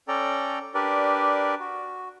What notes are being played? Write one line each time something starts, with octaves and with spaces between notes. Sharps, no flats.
C#4 A4 D5 G5 A#5
D4 G4 A#4 B4 D5
F#4